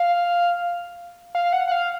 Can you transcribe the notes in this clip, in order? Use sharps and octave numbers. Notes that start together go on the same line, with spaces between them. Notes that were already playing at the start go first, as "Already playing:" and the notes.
Already playing: F5
F5
F#5
F#5
F5